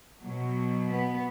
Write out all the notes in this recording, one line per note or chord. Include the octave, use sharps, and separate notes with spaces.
B2 F#3
B3